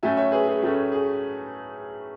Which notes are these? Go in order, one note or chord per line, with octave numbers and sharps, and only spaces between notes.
A2 F#3 A3 C#4 E5 G#5
C#5 E5
G#4 B4
G#4
A2 F#3 A3 C#4
G#4